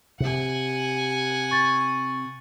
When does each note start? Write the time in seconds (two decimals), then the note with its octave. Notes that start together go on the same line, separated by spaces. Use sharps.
0.20 C3 F#5 G#5
1.51 C#6 A6